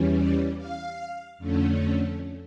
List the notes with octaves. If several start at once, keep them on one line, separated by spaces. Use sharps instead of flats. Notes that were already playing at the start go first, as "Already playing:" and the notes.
Already playing: E2 E3 G3 C#4
D5
F5
F2 D3 A3 C#4